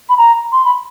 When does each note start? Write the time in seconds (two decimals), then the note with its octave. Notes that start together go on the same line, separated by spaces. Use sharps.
0.09 B5
0.18 A#5
0.52 C6
0.65 B5